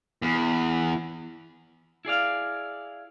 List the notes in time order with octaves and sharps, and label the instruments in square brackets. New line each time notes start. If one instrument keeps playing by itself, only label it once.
[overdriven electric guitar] E2
[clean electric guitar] E4 G#4 D5 F5